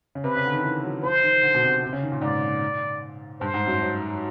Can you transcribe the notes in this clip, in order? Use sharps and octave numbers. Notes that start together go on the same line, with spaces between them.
C#3
C3 B4
C#3
D3
D#3
E3
F#3
F3 C5
D#3
D3
B2
C3
C3
C#3
D#3
A#2
G#2 D5
G2 C5
G#2
F#2
F#2